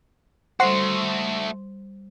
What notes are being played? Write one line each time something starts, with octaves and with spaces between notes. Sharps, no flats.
G3 A3 F#4 C5 F#5 C6 C7